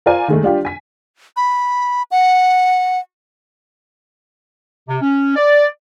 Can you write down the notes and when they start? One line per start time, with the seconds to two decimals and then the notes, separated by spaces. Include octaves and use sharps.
0.06 F4 A#4 C5 D5 F5 G#5
0.28 D#3 G#3 A3
0.43 G3 D4 F4 G4
0.65 G#5 B6
1.37 B5
2.11 F#5
4.88 C3
5.01 C#4
5.36 D5